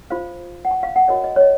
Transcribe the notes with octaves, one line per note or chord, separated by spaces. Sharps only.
F4 C5 F5
F#5
G#5
F5
F#5
F#4 A#4 C#5 D#5
D#5
C#5
D#5